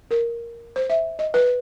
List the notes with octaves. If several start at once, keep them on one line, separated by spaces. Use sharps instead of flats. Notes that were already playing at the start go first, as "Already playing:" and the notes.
A#4
C5
E5
D#5
B4